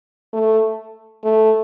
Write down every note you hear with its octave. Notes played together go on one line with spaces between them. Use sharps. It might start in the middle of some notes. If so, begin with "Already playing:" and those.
A3
A3